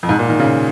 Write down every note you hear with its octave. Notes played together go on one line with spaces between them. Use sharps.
F2
G#2
A#2
D#3
C#3